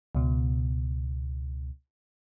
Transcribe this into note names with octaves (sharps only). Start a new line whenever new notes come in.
C#2 B2